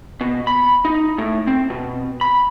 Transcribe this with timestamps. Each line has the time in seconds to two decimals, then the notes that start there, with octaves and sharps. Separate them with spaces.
0.21 B2
0.47 B5
0.85 D#4
1.18 A2
1.47 C4
1.70 B2
2.21 B5